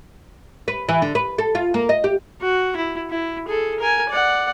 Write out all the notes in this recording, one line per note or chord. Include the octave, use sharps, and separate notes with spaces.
B4
E3
D3
B4
A4
F4
A#3
D#5
G4
F#4
E4
E4
G#4 A4
A#4 G#5
D5 F#5